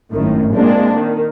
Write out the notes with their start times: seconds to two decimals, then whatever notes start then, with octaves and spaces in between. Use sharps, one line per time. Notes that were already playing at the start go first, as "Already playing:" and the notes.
0.13 G#1 F#2 A2 D#3
0.53 A#2 G#3 A#3 C4 D4
0.97 D#3